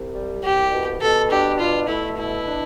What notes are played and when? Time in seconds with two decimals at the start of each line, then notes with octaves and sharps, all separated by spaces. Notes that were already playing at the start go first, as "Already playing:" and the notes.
Already playing: C2
0.14 G3
0.43 C2 G4
0.72 B2
1.01 B2 A4
1.31 D4 G4
1.59 B2 F4
1.88 A3 E4
2.17 B2 E4
2.47 D4